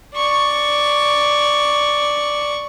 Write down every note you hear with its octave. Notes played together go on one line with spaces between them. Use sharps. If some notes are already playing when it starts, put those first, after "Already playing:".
D5 C#6